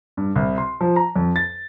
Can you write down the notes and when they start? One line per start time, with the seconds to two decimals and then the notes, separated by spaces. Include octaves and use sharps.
0.17 G2
0.36 C2
0.58 C6
0.81 F3
0.96 A#5
1.16 F2
1.36 A6